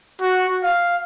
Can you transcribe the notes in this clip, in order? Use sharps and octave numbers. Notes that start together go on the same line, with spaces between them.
F#4
F5